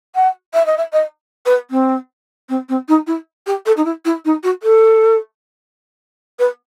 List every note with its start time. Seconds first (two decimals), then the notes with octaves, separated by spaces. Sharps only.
0.15 F#5
0.54 E5
0.66 D#5
0.78 E5
0.93 D#5
1.46 B4
1.71 C4
2.49 C4
2.69 C4
2.88 D#4
3.07 E4
3.46 G4
3.66 A4
3.77 D#4
3.85 E4
4.05 E4
4.25 D#4
4.43 F#4
4.63 A4
6.39 B4